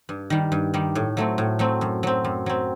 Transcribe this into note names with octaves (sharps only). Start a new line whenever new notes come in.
G2
D#3 G3
G2
D#3 G3
A2
F#3 A3 C4
A2
F#3 A3 C4
F#2
F#3 C4
F#2
F#3 C4